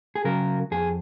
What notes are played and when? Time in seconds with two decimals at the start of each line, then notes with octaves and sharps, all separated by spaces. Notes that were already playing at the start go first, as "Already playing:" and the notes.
0.15 G#4
0.25 C#3 F#3 A#4
0.71 F2 G#4